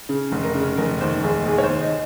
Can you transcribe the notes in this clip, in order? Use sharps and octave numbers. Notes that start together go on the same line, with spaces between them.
C#3
F1
A#4
C#3
F1 A#4
D#2 C5
F1 G#4
D#2 G#4
C#5
C5
D#2
D#5